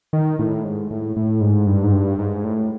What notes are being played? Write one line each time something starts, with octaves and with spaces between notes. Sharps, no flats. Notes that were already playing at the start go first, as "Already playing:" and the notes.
D#3
A2
G#2
A2
A2
G#2
G2
G#2
G2
G#2
A2